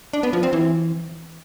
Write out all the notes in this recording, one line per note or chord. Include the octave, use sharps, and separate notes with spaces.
D4
B3
F3
C4
E3